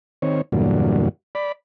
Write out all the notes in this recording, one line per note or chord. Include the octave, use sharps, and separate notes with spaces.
D#3 C4 C#5
E2 G2 A#2 D3 F#3
D5 B5